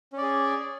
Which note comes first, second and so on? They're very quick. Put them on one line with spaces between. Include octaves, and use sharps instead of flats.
C#4 D5 G#4